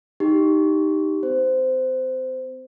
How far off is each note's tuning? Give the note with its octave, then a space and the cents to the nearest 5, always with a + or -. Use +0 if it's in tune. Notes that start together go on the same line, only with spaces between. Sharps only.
D#4 +0 G4 +0 C6 +40
C4 -40 C5 -15